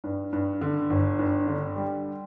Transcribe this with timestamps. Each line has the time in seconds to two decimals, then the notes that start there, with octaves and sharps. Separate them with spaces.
0.04 G2
0.33 G2
0.61 D3
0.90 G1
1.19 G2
1.48 D3
1.76 G3